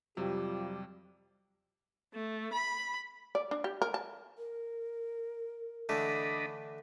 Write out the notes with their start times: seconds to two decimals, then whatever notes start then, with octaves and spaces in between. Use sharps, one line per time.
0.17 F2 C3 F#3 G3 F4 G4
2.14 A3
2.52 B5
3.35 D5
3.51 D4
3.64 G4
3.82 A#4
3.94 A5
4.38 A#4
5.89 D3 E3 A3 D4 D#5 B5